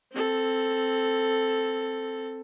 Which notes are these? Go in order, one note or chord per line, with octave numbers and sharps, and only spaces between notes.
C4 A4